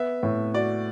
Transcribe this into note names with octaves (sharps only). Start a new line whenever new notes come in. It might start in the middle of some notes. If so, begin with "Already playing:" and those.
Already playing: B3 E5
A2
F#4 D5